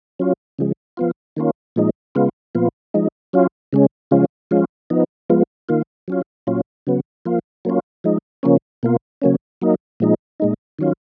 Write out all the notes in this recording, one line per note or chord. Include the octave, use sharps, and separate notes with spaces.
F#3 C#4 F4
C#3 F3 G#3
F3 B3 F4
D#3 A#3 C#4 F4
A#2 F3 G#3 D#4
C#3 G#3 B3 F4
A#2 F3 B3 F4
F3 G#3 D#4
F#3 C#4 F4
C#3 G#3 C#4
C#3 F3 G#3 C#4 F4
F3 G#3 C#4 F4
F3 B3 D#4
F3 G#3 B3 F4
D#3 A#3 F4
F#3 C#4 F4
A#2 F#3 C#4 F4
C#3 F#3 B3
F3 A#3 F4
F#3 A#3 C#4 F4
F3 G#3 D#4
C#3 F3 A#3 C#4
B2 A#3 F4
C#3 F#3 A#3 C#4
F#3 A#3 D#4
A#2 F3 G#3 D#4
A#2 G#3 D#4
D#3 F#3 C#4 F4